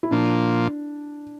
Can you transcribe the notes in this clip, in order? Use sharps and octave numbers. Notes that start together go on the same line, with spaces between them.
E4
A#2 F3 A#3 D4